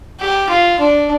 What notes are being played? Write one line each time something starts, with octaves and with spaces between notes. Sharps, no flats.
G4
F4
D4